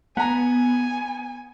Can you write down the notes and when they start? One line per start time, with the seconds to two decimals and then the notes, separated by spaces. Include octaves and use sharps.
0.17 B3 F#5 G#5 A#5